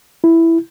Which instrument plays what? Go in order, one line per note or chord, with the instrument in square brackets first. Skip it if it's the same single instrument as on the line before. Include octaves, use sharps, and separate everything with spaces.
[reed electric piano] E4